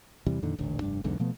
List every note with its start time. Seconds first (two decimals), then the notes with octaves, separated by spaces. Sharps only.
0.26 E2 C3 E3 G3
0.42 F2 A#2 D3 D#3
0.59 D#1 A1 D3
0.81 F1 G2 D4
1.04 B1 E2 G#2 D3
1.19 B2 F3 A3 B3